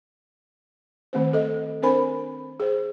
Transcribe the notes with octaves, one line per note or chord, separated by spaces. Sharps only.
D#3 A3 C4 C5
A4 D#5
C4 D4 A#4 C5 G#5 B5
G#4 C5